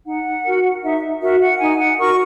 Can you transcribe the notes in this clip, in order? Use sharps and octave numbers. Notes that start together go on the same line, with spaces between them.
D#4 F#5
F#4 A#4
D#4 E5
F#4 A#4 E5
F#5
D#4 G#5
F#5
F#4 A#4 C#6